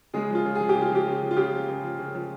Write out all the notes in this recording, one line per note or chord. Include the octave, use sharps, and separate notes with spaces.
C#3 G#3 G#4
F3 F4
C#3
G#4
F3
G4
C#3
F4
F3 G4
C#3
F3
F4
C#3 G4
F3
C#3
F3
C#3
F3